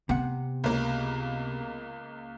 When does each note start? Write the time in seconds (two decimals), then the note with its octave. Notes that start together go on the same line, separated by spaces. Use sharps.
0.09 C3 B3 F#5
0.64 C#2 A#3